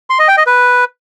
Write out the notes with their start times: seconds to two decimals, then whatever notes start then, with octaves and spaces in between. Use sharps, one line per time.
0.10 C6
0.19 D#5
0.28 G5
0.37 D#5
0.47 B4